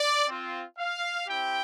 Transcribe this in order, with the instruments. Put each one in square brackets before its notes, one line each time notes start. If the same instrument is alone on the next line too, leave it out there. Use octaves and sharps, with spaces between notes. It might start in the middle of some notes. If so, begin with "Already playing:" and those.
Already playing: [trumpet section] D5
C4 F4
F5
C4 E4 G4 G5